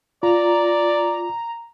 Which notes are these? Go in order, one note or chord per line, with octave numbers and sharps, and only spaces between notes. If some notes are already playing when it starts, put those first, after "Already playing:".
F4 D5 A#5